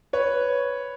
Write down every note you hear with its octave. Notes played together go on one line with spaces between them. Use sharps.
B4 C#5